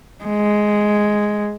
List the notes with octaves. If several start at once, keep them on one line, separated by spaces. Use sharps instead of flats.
G#3